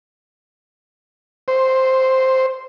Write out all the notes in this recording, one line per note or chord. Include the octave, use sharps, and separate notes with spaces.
C5